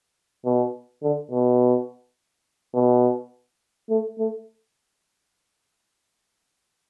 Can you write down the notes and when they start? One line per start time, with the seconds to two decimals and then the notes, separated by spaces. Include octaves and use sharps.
0.45 B2
1.03 D3
1.31 B2
2.74 B2
3.90 A3
4.19 A3